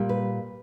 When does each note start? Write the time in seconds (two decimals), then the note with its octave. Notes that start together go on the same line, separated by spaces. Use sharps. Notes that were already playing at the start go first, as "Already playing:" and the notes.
Already playing: A#2 G3
0.09 B4